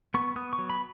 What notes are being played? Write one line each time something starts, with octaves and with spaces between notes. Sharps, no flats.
B3 C#6
B3 D#6
C#6
F#3
B5